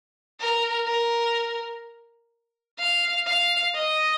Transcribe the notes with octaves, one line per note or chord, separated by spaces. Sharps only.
A#4
A#4
F5
F5
D#5